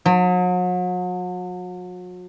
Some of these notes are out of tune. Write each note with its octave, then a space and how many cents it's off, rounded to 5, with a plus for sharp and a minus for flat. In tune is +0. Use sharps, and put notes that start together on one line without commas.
F#3 -40